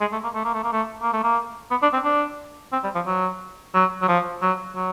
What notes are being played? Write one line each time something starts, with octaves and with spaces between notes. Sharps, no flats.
G#3
A3
A#3
A3
A#3
A3
A#3
A3
A#3
A3
A#3
B3
D4
C4
D4
C4
G3
F3
F#3
F#3
F#3
F3
F#3
F#3